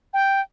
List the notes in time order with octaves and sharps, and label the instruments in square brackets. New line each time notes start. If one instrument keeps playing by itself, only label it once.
[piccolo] G5